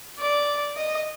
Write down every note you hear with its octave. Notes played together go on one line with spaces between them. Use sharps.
D5
D#5